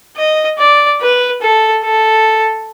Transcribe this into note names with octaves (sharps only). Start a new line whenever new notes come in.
D#5
D5
B4
A4
A4